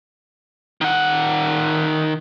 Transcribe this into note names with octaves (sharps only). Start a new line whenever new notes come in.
D#3 F#5